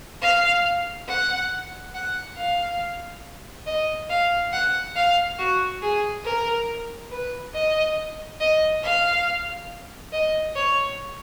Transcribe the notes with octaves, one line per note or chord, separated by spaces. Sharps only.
F5
F#5
F#5
F5
D#5
F5
F#5
F5
F#4
G#4
A#4
B4
D#5
D#5
F5
D#5
C#5